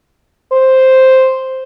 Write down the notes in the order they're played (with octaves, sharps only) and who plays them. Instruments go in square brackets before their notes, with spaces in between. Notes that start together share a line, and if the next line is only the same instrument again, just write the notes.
[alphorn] C5